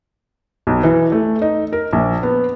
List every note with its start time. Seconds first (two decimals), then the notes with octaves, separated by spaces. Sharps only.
0.67 B1
0.83 E3
1.12 A3
1.42 D#4
1.73 A#4
1.93 A#1
2.23 B3